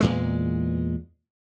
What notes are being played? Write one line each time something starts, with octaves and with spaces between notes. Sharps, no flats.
E2 A#2 G#3